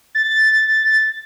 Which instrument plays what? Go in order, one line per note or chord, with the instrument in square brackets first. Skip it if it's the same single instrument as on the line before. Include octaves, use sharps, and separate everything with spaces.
[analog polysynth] A6